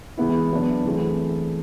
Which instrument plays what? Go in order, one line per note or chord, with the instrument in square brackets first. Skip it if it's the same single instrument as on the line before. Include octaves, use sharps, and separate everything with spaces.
[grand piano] E3 G#3 B3 E4
F#3 B3 D4
E3 A3 C4 E4 G#4